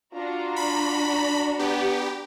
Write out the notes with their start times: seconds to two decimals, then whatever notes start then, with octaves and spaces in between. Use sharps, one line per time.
0.14 D4 F4 F#4 A#5
0.56 B5
1.59 B3 G4